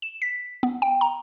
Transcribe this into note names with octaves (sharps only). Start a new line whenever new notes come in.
E7
B6
B3
G5
A#5